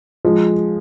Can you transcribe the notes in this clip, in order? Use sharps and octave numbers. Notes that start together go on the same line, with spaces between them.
F3 G#3